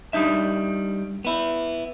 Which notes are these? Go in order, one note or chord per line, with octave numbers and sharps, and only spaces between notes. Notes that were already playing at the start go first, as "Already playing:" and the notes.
G3 D4 D#4 E5
B3 E4